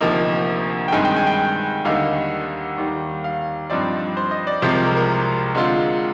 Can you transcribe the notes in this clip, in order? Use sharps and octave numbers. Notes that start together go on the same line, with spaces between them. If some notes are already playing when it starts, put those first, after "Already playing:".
D2 C3 F3 A#3 D#4
G5
G2 D#3 G#3 C4 G#5
G5
G#5
G5
D#2 D3 G3 A#3 D#4 F5
D#2 D#3 G3
F5
G2 F3 C4 D#4 D5
C5
D#5
D5
C2 C3 F3 G#3 C4 C5
A#4
A#4
A#4
D3 G#3 C4 F4